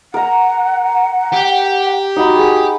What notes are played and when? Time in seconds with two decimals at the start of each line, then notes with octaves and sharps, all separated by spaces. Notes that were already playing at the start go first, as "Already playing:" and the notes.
0.14 A#4 F#5 A#5
1.32 G4
2.16 D#4 F#4 F#5 B5
2.36 G#4